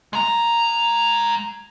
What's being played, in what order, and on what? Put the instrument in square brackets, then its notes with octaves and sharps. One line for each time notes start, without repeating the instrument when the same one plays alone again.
[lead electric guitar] G#3 A#5